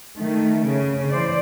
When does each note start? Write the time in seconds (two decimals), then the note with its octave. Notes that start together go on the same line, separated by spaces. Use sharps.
0.18 D#3 A3
0.64 C#3
1.10 E3 C5 D5